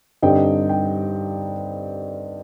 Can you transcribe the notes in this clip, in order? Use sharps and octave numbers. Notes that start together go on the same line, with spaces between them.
G2 D3 G3 C4 D#4 G5
G5